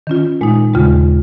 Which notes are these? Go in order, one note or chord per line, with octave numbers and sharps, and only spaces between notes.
D#3 C#4 F4
A#2 G#3 D#4
D#2 C#3 G#3 F4